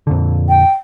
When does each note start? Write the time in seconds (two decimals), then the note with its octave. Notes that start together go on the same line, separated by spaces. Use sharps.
0.07 F2 A#2 D3
0.49 G5